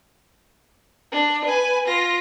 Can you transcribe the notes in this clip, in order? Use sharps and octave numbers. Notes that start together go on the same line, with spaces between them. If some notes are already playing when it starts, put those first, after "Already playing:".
D4
B4 G#5
F4 A#6